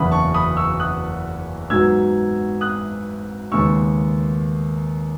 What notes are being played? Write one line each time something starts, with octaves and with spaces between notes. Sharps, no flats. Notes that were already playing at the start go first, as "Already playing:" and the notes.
Already playing: F#1 E2 C#3 E3 B5 D#6
A5 C#6
B5 D#6
C#6 E6
D#6 F#6
G#2 F#3 B3 E6 G#6
D#6 F#6
D#2 C#3 G#3 B3 C#6 E6